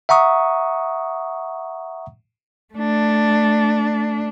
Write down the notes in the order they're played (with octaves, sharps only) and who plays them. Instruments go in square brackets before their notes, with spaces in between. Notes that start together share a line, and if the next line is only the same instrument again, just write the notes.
[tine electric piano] E5 F#5 A#5 C#6 D#6
[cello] A3 D4